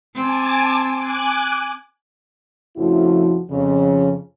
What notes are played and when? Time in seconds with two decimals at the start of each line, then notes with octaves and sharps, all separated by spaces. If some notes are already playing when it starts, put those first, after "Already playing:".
0.15 C4 G#5 A5 D6
0.93 G#5 D6 F#6
2.77 F2 C#3 F3 A3 E4 F#4
3.50 F2 C#3